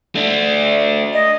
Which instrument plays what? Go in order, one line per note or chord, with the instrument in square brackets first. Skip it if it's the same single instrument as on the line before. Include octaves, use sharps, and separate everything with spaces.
[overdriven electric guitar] A3 D4
[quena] D#5